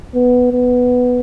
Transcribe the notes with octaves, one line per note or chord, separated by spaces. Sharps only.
B3
B3